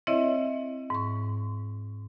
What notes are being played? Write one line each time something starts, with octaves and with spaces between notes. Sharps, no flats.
C4 E4 C#5 D#5 E5
G#2 C#6